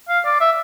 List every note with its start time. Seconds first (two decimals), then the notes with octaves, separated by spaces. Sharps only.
0.09 F5
0.25 D5
0.40 E5